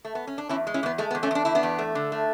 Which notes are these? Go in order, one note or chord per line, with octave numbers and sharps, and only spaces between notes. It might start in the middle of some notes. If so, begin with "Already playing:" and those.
A3
B3
C#4
D4
E2 C#4 E4
G#3
C#4 E4
E2 B3
G#3 A3
B3
E2
A3 C#4
E2 D4
E2 E4
B3 D4
E2
A3
D3
A3